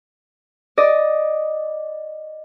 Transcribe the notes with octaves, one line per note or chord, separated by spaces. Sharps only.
D5 D#5